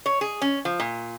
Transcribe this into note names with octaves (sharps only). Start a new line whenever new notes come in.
C#5
G#4
C#4
F3
A#2